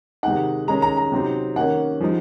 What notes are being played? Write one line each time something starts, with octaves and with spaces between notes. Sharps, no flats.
C3 D#3 G#3 D#4 F#5
D#3 G#3 C#4 A#5
A#5
A#5
C3 F#3 C4 D#4
D#3 A#3 C#4 F#5
F3 G#3 D#4